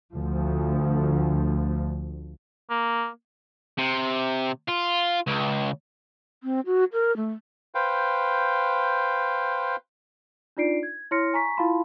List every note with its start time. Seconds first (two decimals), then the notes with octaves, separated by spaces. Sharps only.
0.15 D2 F3
2.70 A#3
3.78 C3
4.69 F4
5.27 C#2
6.44 C4
6.66 F#4
6.93 A#4
7.17 A3
7.75 B4 C5 F5 G5
10.57 D4 D#4 F4 D5 C7 D7
10.83 G#6
11.11 E4 C#5 C6 F6 A#6 C#7
11.34 G#5 A#5 C#6 B6
11.57 E4 F4 F5 A5 B5 C6